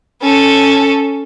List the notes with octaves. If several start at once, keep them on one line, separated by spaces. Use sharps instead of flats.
C#4 A4